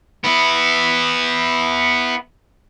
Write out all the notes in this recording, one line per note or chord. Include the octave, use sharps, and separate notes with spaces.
B3 E4